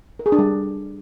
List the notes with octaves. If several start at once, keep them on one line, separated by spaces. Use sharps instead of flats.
A#4
G#4
D4
G3